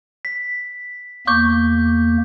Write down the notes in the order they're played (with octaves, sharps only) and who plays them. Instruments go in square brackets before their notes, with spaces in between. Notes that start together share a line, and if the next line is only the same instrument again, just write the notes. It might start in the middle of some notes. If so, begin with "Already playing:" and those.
[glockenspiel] B6
[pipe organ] E2 A#3 [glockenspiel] C#6 D6 G6